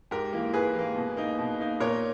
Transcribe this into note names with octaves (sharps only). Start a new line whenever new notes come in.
G#2 G4 A#4
E3 A#3
G#2 G#4 B4
E3 A#3
B2
A#3 D#4
B2
A#3 D#4
A#2 A#4 C#5